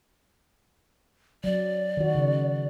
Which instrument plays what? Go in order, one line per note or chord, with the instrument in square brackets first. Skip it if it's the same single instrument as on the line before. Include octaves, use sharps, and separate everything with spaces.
[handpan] F#3 [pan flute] D5
[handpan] D#3 F#4
C#3